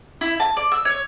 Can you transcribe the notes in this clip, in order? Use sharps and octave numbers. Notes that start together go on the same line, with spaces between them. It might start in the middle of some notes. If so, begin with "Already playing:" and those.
E4
A5
D5
E6
C#5